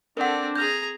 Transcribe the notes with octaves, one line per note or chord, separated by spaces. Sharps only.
C4 D4 A4 A#4 F#5
G#4 A#5 F6 G6